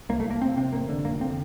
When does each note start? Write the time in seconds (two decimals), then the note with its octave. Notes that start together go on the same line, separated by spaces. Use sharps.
0.09 C2 A#3
0.20 A3
0.25 C2
0.30 A#3
0.41 F1 C4
0.57 C3 C4
0.73 A1 A#3
0.89 D3
1.05 F1 A#3
1.21 D3 C4